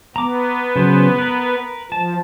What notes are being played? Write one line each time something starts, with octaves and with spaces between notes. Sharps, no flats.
B3 A#5 D6
C#3 F#3 C5
A#4 B4
F3 A5